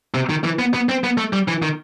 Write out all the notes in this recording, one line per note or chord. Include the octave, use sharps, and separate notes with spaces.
C3
D#3
E3
B3
B3
C4
B3
A3
G3
E3
D#3